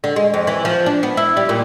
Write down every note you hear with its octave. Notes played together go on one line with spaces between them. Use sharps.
D3
G#3
F2
E3
F3
D4
B3
E4
G3
A#2